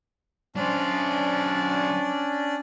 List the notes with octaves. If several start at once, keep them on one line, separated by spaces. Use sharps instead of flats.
F#3 C#4 D4 C5 D5